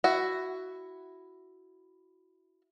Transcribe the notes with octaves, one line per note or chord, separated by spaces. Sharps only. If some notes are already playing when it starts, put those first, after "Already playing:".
E4 F#4